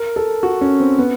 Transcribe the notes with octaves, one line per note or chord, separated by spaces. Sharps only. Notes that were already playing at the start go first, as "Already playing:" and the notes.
Already playing: A#4
A4
F#4
C#4
C4
B3